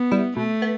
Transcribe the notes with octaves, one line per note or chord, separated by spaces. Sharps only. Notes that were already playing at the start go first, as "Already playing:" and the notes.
Already playing: B3
G3 E4
B2 A3
B3